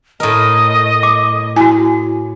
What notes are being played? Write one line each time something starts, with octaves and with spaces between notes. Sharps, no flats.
A2 A#4 D#5
D6
E4 F#4 G#5